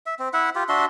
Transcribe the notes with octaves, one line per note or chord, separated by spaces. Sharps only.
E5
C4
E4 E5 F#5
F4 G4
D4 F#4 E5 C6